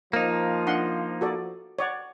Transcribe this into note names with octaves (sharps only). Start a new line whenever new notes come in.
F3 A#3 D#4
D4 F#5 C6
F#4 A4 D5
C#5 D5 F#5